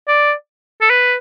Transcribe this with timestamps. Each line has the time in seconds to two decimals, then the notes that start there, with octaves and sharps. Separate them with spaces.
0.08 D5
0.81 A4
0.90 B4